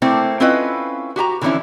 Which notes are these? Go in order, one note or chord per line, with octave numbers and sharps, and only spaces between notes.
A3 A#3 C4 E4 A4
C4 C#4 E4 F4 B4 D#5
F#4 G4 G#5 A#5
D3 E3 F3 C4 C#4 E4